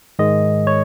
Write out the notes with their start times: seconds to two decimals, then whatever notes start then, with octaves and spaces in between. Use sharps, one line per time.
0.19 G#2 D#3 G#3 D#5
0.67 C#5